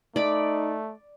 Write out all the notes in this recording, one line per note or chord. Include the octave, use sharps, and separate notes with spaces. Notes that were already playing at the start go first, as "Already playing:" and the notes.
A3 D#4 D5 B5